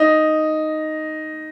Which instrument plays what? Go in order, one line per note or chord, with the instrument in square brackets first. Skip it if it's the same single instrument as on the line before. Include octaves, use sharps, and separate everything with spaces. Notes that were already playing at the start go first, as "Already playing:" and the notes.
Already playing: [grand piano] D#4